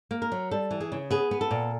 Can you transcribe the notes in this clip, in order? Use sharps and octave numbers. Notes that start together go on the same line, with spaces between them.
A#3
A#4
F#3
G3 A4
E3
G#4
C#3
B3 G#4
B3
A4
A#2